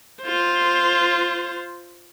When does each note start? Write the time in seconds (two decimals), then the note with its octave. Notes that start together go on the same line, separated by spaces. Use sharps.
0.22 F4 C5